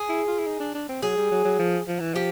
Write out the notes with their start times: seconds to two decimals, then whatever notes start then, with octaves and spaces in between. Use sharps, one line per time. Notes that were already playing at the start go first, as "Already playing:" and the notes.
Already playing: G#4
0.09 E4
0.28 F4
0.39 E4
0.47 D#4
0.60 D4
0.75 D4
0.89 C4
1.02 F#3 G#4
1.17 G3
1.31 F#3
1.45 F#3
1.59 F3
1.88 F3
2.00 E3
2.14 F3 G4